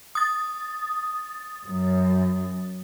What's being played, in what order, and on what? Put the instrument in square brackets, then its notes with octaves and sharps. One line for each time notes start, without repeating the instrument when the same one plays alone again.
[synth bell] D#6 A6
[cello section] F#2